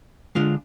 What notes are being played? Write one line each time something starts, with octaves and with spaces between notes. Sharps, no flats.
D3 G#3 D4 F4